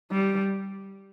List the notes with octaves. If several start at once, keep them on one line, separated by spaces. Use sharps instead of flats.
G3